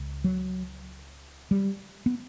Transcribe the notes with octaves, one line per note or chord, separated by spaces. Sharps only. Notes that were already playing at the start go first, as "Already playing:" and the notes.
Already playing: C#2 C#3
F#3
G3
B3